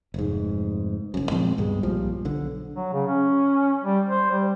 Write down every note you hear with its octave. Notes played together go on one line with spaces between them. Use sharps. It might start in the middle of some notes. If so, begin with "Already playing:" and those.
F1 G#2
F#1 F#2
A#2 F3 G#3 C4
C#2 G2 B2 G#3
B1 A#2 F3 G3
B1 D3
F#3
C#3
C#4
G3
C5
G3